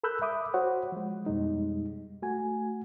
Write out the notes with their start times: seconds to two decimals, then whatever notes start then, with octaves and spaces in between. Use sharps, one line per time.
0.04 A4 A#4 B5 E6 F#6 G6
0.22 E5 B5 D6 D#6
0.54 F#4 C5 C#5 F#5
0.92 F3 G#3
1.26 F2 B2 G3 G#3 D#4
2.22 A3 F#4 G#5